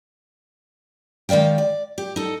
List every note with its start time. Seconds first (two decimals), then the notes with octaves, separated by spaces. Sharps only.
1.29 D#3 G#3 D5 F5 G5
1.58 D5
1.98 G4
2.16 D#4 A4